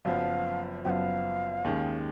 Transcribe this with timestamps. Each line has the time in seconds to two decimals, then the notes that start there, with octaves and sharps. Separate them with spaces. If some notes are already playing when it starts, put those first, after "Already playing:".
0.05 F#1 F#2 F3 B3 F5
0.85 F#1 F#2 F3 B3 F5 G5
1.64 D#2 D#3 G#3 C#4